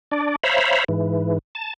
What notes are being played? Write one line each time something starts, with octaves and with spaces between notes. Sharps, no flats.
D4 D5
C5 C#5 E5 F5 A#5 B5
G#2 E3
A5